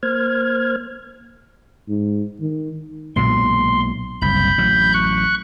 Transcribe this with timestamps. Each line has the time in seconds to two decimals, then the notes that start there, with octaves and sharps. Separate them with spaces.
0.03 A#3 C5 F6 G#6
1.89 G#2
2.41 D#3
3.16 B1 A#2 G#3 C6
4.22 F#1 C2 B5 G6
4.58 A1 F#3
4.94 C#6 F#6